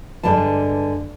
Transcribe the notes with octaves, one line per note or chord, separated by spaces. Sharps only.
G2 D3 G#3 B4 A5